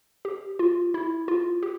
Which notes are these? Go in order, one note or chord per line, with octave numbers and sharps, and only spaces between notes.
G4
F4
E4
F4
G4